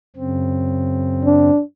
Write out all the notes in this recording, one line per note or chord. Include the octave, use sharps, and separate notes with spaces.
F#2 C#3 C4
D4